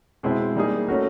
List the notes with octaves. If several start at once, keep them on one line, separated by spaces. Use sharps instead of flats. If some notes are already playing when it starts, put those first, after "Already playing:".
B2 G#3 C4 E4
G3 A#3 D#4 G#4
A3 C#4 F#4 A#4